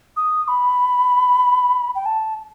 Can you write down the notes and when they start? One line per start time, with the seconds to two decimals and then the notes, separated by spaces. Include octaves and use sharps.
0.16 D#6
0.48 B5
1.95 G5
2.06 A5